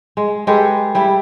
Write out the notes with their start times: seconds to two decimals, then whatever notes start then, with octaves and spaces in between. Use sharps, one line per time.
0.17 G#3
0.47 G#3 G4 A4 B4
0.95 G3 E4 E5